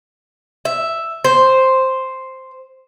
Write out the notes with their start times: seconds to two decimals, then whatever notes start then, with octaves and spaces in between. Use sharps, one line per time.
0.65 E5
1.24 C5